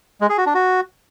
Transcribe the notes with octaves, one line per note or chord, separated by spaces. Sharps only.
G#3
G#4
F#4
D4
F#4